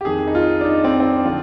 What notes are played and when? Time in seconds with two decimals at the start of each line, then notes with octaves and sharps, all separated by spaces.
0.01 G4
0.05 F2 D#3 G#4
0.28 D#4
0.35 F4
0.61 D4
0.65 D#4
0.84 C4
1.00 C4
1.05 D4
1.25 D3 F3 F4